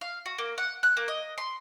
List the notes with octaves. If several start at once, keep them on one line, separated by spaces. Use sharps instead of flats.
F5
F#4
A#3
F#5
F#6
A#3
D#5
C6